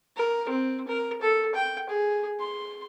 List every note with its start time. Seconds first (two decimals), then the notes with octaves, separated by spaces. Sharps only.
0.17 A#4
0.49 C4
0.88 A#4
1.21 A4
1.55 G5
1.89 G#4
2.39 C6